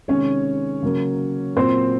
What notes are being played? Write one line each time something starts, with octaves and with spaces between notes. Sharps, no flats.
C3 D#3 G#3 C#4 C#5
C#3 F#3 A#3
A#2 F#3 A#3 C4 C5